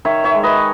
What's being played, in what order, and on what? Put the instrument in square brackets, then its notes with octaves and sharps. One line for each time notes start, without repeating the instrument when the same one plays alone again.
[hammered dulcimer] D#3 C#5 E5
C#5 E5
G#3
B4 D#5